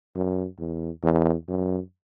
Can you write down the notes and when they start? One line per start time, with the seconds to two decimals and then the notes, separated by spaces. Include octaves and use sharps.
0.15 F#2
0.59 E2
1.03 E2
1.48 F#2